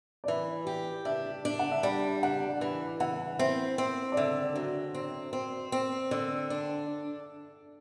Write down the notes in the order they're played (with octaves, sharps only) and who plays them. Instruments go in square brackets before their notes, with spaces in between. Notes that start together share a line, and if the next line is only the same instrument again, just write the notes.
[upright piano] D5
[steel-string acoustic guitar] E3 [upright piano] E5
[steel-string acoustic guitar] G4
[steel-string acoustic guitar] D4 [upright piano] E5
[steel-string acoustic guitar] D4
[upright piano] F#5
E5
[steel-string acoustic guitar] G3 [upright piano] D5
[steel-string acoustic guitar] D4 [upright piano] F#5
[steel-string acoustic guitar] E3
[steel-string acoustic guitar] E3 [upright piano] F#5
[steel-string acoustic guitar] C4 [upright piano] E5
[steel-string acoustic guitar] C4
[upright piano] D5
[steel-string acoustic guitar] D3 [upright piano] E5
[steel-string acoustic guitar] F#3
C4
C4
C4
D3
D4